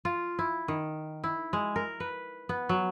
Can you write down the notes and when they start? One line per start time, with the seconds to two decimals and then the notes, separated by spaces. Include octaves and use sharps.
0.05 F4
0.39 E4
0.68 D#3
1.24 E4
1.53 G#3
1.76 A#4
2.00 B4
2.49 B3
2.69 F#3